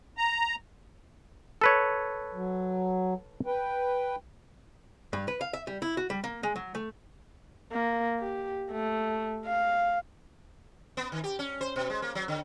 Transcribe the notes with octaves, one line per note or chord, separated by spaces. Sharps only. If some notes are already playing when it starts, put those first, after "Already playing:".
A#5
A4 B4 C#5
F#3
B4 G5
G2
B4
F5
E5
G3
E4
F#4
G3
A#3
G#3
F#3
A3
A#3
G4
A3
F5
B3
D#3
G4
C#4
C5
B2
G#3
A#3
F#3
D3